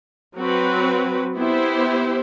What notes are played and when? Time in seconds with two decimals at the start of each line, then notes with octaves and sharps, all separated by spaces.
0.36 F#3 C4 F#4 B4
1.38 B3 E4 G4 C5